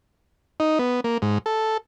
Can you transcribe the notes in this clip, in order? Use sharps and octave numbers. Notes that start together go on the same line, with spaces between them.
D#4
B3
A#3
G#2
A4